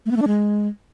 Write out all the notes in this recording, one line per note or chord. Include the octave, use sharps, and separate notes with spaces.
A3
B3
A3
D4
G#3